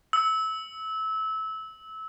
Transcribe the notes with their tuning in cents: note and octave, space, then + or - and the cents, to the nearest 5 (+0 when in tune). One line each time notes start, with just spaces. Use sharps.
E6 -25